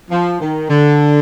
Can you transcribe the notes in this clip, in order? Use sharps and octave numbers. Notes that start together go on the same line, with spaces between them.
F3
D#3
D3